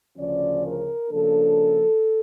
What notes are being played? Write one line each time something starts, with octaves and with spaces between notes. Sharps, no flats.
D2 C#3 F3 C#4 D5
A#4
C#3 F3 A#3 D4 A4